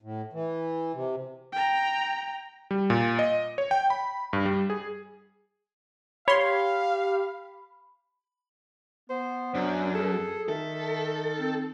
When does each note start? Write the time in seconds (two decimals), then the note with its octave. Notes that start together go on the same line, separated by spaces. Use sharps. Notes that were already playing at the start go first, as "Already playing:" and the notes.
0.02 A2
0.33 E3
0.94 C3
1.52 G5 A#5
2.71 G3
2.90 A#2
3.19 D#5
3.58 C#5
3.71 G5
3.90 B5
4.33 G2
4.46 G3
4.70 G#4
6.28 G4 C#5 F5 B5 C6
9.09 B3 C5
9.54 F#2 D4
9.94 G#4 A4
10.49 D#3 A4 E5
11.40 C4